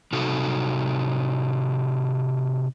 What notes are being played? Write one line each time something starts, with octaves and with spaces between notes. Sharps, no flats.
C3 D#4 F#4 A4